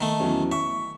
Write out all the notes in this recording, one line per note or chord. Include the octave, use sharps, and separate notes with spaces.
D#3 A3
E2 F#3 C#4
E5 C#6